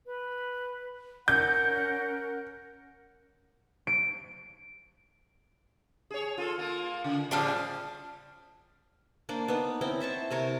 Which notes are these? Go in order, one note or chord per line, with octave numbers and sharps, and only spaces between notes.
B4
C#4 A#4 F#5 G6
D7
G#4 C#5
F4 A4
A#3 F4
C#3
A2 C#3 F3 G3 D4 F5
A#3 D4 C5 D5
B3 D#4
C4 C#4 E4 G5
C5 E5 A5 C#6
C3 A#4 C#5